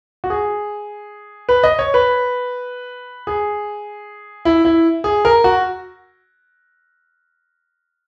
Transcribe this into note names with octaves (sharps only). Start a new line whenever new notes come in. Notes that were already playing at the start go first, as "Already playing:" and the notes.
F#4
G#4
B4
D#5
C#5
B4
G#4
E4
E4
G#4
A#4
F#4